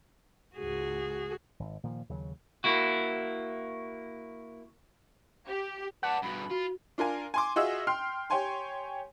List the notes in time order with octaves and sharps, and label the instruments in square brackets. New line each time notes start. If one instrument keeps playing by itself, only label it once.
[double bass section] C#2 G#2 [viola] F#4 G#4
[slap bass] G#1
A#2 D#3 F3
D#2 C#3 F#3
[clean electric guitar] A#3 E4 F#4
[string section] G4
[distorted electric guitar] B4 D5 [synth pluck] F#5 [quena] A5
[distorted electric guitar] G2 B2 [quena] B5
[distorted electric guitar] F4 [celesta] F#4
[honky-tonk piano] D4 F4 A#4 G#5
G#5 C6 D6
F4 F#4 G#4 D#5 E5 E6
G5 C6 F6 C7
G4 C#5 G5 G#5 C6